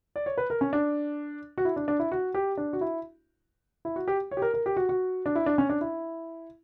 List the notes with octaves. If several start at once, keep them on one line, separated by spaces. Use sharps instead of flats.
D5
C#5
B4
A#4
C#4
D4
F#4
E4
D4
D4
E4
F#4
G4
D4
F#4
E4
E4
F#4
G4
C#5
G4
A#4
A#4
G4
F#4
F#4
D4
E4
D4
C#4
D4
E4